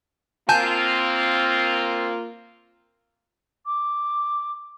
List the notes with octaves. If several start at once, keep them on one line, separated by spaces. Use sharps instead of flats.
A#3 C4 F4 G#5 A5 G6
D6